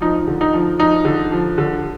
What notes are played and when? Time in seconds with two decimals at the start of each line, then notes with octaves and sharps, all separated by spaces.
0.01 F3 D#4
0.27 D3
0.41 D#4
0.53 F3
0.80 F3 D#4
1.05 D3
1.32 F3
1.58 D3